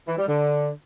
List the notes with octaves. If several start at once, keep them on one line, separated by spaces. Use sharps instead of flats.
E3
G3
D3